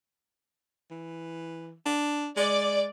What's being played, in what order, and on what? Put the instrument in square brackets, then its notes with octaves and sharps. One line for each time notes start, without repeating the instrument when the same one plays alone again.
[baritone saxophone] E3
D4
[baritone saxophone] G#3 [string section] D5